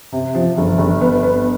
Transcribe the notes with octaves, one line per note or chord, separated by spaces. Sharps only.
C3
F3
G1
G1
B3
B3